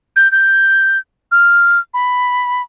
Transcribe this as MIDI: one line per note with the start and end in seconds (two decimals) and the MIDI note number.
0.16 0.31 91
0.32 0.98 91
1.32 1.79 89
1.94 2.62 83